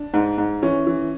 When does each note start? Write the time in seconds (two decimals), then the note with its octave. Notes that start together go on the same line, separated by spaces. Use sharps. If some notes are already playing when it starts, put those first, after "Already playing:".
Already playing: D4
0.14 G#2
0.38 G#2
0.63 E3 C#4
0.87 E3